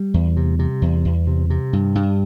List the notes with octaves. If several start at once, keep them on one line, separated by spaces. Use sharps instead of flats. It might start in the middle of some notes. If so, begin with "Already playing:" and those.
Already playing: G3
E2
C3
C3
E2
E2
C3
C3
G2
G2